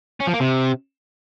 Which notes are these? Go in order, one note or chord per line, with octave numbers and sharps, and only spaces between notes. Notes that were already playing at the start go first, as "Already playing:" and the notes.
C#4
F3
A#3
C3